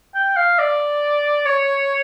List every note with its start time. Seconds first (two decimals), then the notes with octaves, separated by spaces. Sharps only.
0.15 G5
0.37 F5
0.59 D5
1.46 C#5